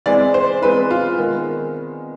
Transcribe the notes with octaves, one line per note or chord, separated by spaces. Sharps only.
E3 G#3 C4 D5
C5
E3 G#3 C4 B4
F4
D#3 G#3 B3